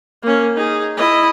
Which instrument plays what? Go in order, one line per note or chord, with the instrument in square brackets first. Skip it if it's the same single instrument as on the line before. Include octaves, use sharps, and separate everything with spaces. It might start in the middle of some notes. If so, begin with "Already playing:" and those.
[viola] A#3 C#4
D#4 G#4
E4 D#5